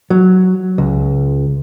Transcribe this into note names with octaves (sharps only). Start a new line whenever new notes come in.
F#3
C#2